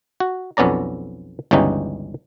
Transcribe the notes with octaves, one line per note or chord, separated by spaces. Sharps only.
F#4
B1 F2 B3 C#4 D5 A#5
G1 C#2 E3 C#4 D#4 G4